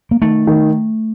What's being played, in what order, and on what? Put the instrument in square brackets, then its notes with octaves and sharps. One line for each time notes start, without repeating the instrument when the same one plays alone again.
[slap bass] A#3
[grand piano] D#3 [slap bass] A3
[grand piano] D#3